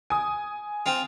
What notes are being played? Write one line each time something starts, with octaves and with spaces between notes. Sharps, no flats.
G#5 D#6
C4 F4